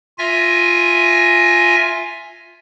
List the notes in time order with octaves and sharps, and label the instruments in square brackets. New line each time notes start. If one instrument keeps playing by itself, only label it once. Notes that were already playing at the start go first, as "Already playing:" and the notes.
[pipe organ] F4 E5 G#5 A#6